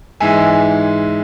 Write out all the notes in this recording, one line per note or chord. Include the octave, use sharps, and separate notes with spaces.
G#2 E3 G#3 E5 G#5